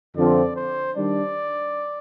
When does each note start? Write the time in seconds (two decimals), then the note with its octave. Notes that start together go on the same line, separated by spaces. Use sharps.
0.16 F2 D3 F3 C4 D5
0.56 C5
0.95 D#3 G3 D4 D5